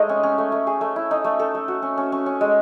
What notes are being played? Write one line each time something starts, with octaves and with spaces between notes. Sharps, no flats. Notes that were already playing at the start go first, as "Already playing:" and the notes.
Already playing: G#3 A3 D#4
C#4
C#4
A3
A3
G#4
A3
E4
D#4
A3
A4
A3
F#4
C#4
C#4
C#4
C#4
G#3